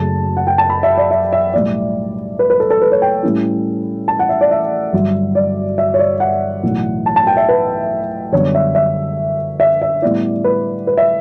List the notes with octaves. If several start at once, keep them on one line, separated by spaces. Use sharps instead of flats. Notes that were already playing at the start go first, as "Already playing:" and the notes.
Already playing: F#1 F#2 C#3 F#3 A3 A5
F#5
G5
A5
B5
E5
D5
E5
E5
B1 A2 G3 D5
B4
B4
A4
A4
B4
C#5
G5
A2 G3 C#4 E4
A5
F#5
E5
D5
E5
G1 G2 F#3
D5
E5
C#5
D5
F#5
B1 A2 E3
A5
A5
G5
E5
B4
F#2 D3 G3 B3 D4 C#5
E5
E5
E5
E5
A2 G3 B3 E4 D5
B4
B4
E5